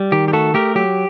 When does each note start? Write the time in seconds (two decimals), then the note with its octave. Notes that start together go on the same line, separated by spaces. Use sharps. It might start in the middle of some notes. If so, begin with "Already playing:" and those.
Already playing: G3
0.12 D#3 G4
0.28 G4
0.33 A3 F#4 A4
0.54 A3 G4 A#4
0.75 F#3 G4